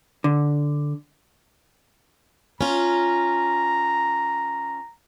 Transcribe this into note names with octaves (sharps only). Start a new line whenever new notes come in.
D3
C#4 F4 A#5